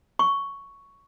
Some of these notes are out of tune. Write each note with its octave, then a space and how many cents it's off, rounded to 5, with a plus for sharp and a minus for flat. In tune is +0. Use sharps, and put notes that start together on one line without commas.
C#6 +5